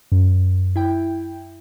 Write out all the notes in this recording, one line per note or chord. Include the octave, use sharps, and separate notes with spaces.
F#2
E4 G5